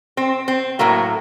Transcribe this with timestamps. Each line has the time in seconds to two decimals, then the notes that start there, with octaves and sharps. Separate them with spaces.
0.17 C4
0.48 C4
0.79 A2 F#3 A3 A#3